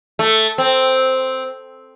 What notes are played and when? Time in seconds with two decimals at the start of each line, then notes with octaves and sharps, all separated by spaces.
0.19 A3
0.58 C4